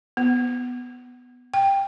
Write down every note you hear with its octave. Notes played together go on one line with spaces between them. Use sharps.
B3
G5